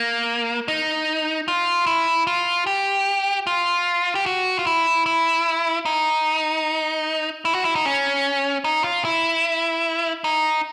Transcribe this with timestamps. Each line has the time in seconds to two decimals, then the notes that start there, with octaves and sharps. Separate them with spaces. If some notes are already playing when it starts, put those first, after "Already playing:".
Already playing: A#3
0.68 D#4
1.48 F4
1.86 E4
2.27 F4
2.67 G4
3.47 F4
4.15 G4
4.26 F#4
4.59 F4
4.67 E4
5.06 E4
5.85 D#4
7.45 E4
7.55 F#4
7.65 E4
7.76 D#4
7.86 C#4
8.64 D#4
8.84 F4
9.05 E4
10.24 D#4